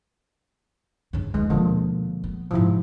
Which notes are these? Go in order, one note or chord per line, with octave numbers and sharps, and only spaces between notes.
G2 C#3
D#2 F3 G#3
D2 B2 D3 F3 A#3
B3
G#2 C3 F3 E4